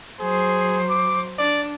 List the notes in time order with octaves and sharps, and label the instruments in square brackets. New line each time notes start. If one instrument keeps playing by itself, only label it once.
[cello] F#3 C5 [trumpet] G#4
[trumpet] D6
[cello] D4 [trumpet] D5